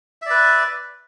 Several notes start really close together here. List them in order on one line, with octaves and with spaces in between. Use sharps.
E5 D5 B4